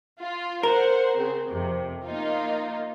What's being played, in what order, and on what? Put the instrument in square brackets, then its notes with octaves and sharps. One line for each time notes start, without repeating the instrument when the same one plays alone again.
[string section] F4
[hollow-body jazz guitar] A#4 [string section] C5 F#5
[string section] C#3 C4
F2 C3
A#3 D#4 F4